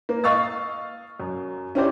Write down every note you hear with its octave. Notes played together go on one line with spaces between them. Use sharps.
A#3
D#5 F5 C#6 E6 A6
F#2
C#4 D4 E4 G4 C5 D5